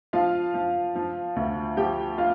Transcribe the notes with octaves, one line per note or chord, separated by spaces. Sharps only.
F3 F4 F5
F3
F3
D2
F3 G4 G5
F4 F5